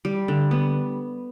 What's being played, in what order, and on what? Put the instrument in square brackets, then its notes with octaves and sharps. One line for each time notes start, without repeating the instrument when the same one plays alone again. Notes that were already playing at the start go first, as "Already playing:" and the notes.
[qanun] G3
D3
B3